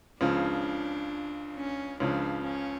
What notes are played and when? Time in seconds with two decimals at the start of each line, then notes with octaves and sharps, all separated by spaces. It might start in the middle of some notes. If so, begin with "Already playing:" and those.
0.21 C#2 C#3 F3 D4
1.55 C#4
2.00 C#2 C#3 F3 D4
2.45 C#4